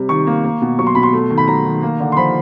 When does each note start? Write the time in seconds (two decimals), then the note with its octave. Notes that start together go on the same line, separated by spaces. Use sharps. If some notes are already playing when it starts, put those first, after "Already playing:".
Already playing: C3 G3
0.09 D#3 C#6
0.27 A#3
0.44 A#3
0.62 B2
0.79 F#3 C#6
0.87 C6
0.95 B2 B5
1.03 C6
1.13 A3
1.30 D#3
1.38 B5
1.48 F#3 A#5
1.65 D#3
1.83 A#3
2.00 D3
2.12 C6
2.16 F3 B5